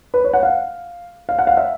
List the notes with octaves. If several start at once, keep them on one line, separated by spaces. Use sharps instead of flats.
B4
C#5
F#5
F5
F5
F#5
F5
E5